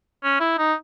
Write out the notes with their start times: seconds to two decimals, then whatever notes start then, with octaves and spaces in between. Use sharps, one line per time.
0.23 C#4
0.40 E4
0.58 D#4